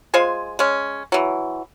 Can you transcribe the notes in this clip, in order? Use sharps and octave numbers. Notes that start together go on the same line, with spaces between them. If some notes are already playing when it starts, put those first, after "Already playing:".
G#3 F4 C5 G#5
G#3 C#4
E3 F#3